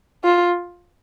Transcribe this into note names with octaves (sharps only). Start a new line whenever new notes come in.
F4